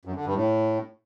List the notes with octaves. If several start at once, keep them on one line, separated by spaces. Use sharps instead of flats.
F#2
D3
G2
A2